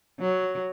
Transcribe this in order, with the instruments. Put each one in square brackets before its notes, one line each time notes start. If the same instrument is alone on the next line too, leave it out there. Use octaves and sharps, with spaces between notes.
[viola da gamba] F#3